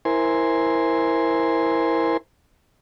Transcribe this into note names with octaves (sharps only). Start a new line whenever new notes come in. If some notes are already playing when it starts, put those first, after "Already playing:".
E4 A#4 C5 G#5 C6